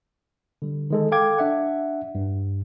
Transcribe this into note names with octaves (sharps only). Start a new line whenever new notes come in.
D3 G3
D#3 G#3 A4
A4 F5 G5 D6 G#6
D4 E5 F#5
G2